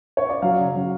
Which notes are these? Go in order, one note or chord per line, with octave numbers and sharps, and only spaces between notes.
C#5
D5
F#3 F5
C#3
F#3